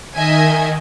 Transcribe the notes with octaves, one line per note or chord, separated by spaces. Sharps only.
D#3 D#5 E5 G#5